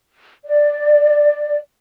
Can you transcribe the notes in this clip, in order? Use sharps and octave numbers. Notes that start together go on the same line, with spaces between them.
D5